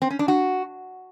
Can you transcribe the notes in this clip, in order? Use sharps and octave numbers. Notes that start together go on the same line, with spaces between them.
C4
C#4
D4
F#4